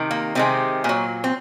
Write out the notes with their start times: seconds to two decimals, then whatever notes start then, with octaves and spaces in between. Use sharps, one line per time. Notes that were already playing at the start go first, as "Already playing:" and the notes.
Already playing: C3 D#3
0.11 A#3
0.35 C3 D#3 G#3 C4
0.84 A#2 F#3
1.24 C4